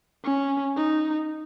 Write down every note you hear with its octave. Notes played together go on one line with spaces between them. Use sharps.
C#4
D#4